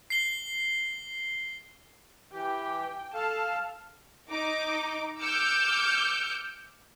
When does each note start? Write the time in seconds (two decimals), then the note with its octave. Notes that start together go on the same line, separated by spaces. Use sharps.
0.10 C7 G7
2.33 E3 G4 G5
3.14 A4 F5 A5 F6
4.29 D#4 D6
5.19 D6 E6 F6 G6 C#7